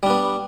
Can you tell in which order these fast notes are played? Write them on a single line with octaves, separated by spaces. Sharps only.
G3 D4 B3